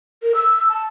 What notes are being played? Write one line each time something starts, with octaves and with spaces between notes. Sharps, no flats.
A#4
E6
A5